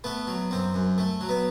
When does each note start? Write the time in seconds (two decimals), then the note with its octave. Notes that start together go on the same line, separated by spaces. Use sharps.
0.04 A3 B3
0.27 F#3
0.51 F#2 C4
0.74 F#2
0.98 A3
1.21 F#3
1.29 B3